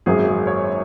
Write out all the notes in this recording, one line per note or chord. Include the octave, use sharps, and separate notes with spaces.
G#1 F#2 F#3 A#3 G#4
G#4
C#5